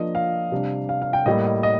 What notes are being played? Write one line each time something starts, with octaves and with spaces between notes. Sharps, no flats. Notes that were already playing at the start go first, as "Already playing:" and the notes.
Already playing: F3 A#3 D4 D#5
F5
C3 G3 D4
F5
F5
G5
A2 G3 A#3 D#5
D#5
D#5